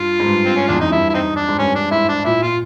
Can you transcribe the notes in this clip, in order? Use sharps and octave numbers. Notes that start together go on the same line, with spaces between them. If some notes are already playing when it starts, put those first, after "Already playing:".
Already playing: G2 F4
G#2
G2
C4
C#4
E2 D4
F2
F#2 D#4
G2 E4
E4
C4 D#4
D4
G#2
G2 C#4
D4
G#2 E4
D4
A#2 E4
A#2 F4